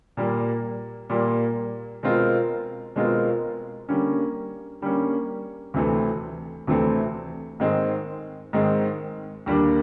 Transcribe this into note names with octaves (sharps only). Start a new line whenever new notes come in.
A#2 G3 A#3
A#2 G3 A#3
B2 G#3 C4 F4 A#4
B2 G#3 C4 F4 A#4
D3 G3 A#3 C#4
D3 G3 A#3 C#4
D2 C3 E3 A3 C4
D2 C3 E3 A3 C4
G#2 D#3 G#3 C4
G#2 D#3 G#3 C4
D#2 D3 G3 A#3 D4